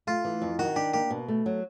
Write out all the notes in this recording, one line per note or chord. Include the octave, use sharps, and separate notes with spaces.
A3 F4
E3
F2
D#3 F#4
D4 G4
A#3 G4
B2
A3
F#3